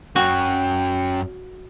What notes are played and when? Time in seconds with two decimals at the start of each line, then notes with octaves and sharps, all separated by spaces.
0.16 F#2 C#4 F#4 G5